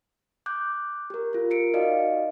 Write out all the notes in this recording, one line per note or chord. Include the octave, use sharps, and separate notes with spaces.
D6 F#6 G6
G4 A#4
F4 A#4
A#4 C#7 D7
D#4 F#4 D5 D#5 F5